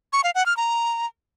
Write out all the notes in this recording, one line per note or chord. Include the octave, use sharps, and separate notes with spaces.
C#6
F5
F#5
F6
A#5